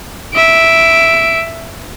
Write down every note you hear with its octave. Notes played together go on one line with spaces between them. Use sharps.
E5 D7